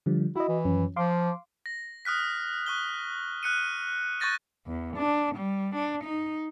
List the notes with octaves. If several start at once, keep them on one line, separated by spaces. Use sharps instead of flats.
D3 F3 G3
E4 F#4 D#5
E3
F#2 F3 C#4
F3 F5 C6 D6
A#6
D#6 F6 F#6 B6
C#6 F#6 G7
F6 F#6 C#7 D#7
C#6 F#6 G6 A6 A#6 D#7
E2
D4
G3
D4
D#4